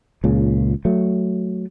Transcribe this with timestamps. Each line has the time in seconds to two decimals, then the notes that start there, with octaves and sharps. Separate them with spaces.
0.24 C#2 A#2 C#3
0.85 F#3 A3